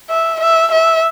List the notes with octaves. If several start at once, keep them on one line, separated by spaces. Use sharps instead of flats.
E5
E5
E5